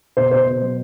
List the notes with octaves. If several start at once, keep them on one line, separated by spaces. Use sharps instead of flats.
B2 C5
B2 C5
B2
F#3